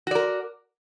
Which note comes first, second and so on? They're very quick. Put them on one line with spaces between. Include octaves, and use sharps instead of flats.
F#4 D5 A#4